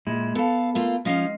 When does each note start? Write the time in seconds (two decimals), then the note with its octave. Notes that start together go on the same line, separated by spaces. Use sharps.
0.07 A#2 G#3 E4
0.35 B3 A4 F5 A5
0.75 A3 A#3 F4
1.05 F3 G#3 C#4 D#4 D#5 F5